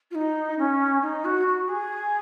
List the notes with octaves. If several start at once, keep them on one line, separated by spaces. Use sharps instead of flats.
F4
D#4
C#4
D#4
F#4
F#4
G#4